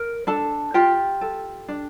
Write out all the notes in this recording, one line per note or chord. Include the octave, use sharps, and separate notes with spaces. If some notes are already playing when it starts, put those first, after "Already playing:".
Already playing: A#4
D4 A4 A5
F4 G4 G5
A4
D4